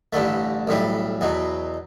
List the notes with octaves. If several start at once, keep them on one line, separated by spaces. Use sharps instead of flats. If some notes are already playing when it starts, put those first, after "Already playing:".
A1 G2 D3 A3
B1 A2 E3 G3
E2 B2 F#3